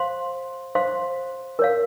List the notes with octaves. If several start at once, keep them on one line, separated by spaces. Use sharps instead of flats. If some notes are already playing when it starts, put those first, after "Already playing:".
Already playing: C5 F5 C6
C5 F5 C6
A#4 C#5 F5